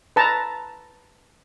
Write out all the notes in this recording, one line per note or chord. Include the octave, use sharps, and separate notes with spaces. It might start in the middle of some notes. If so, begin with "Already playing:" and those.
B4 A5 A#5